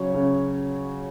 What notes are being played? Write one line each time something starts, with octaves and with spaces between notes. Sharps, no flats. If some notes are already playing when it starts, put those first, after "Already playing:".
Already playing: C#3 F#3 C#5
C#3